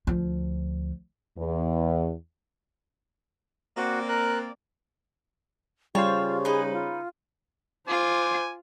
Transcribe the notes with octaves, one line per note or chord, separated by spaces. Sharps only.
D2 F3
E2
A#3 C4 F#4 D5
A#4 F#6
C#3 G3 F4 C5 C#5 A5
D#4 G#4 B4
F4
F4 C5 G#5 D6